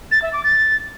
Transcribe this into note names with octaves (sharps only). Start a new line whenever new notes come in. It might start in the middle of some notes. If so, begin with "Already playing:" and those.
A6
E5
D6
A6